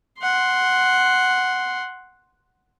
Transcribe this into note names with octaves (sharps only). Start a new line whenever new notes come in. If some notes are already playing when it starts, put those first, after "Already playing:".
F#5 C6